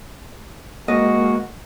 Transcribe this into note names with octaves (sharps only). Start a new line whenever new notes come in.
G#3 A#3 F#4 D#5